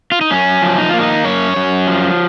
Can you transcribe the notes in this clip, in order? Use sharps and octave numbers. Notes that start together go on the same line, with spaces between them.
F4
D#4
F#2 C#4
F3
D#4
A#3 F4
D#4
F#2 C#5
F#2
F3